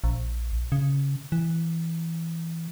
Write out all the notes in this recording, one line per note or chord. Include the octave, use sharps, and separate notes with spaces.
A#1
C#3
E3